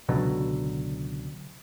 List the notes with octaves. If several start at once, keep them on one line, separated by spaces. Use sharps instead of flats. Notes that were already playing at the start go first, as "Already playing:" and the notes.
C#2 B2 D3 F#3